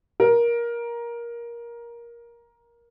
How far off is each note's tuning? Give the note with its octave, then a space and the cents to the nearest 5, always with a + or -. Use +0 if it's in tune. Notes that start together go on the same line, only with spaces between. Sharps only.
A#4 +15